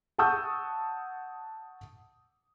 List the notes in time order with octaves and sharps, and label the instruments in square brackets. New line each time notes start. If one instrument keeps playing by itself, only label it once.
[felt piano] F#5 A5 C#6 D#6 E6 G6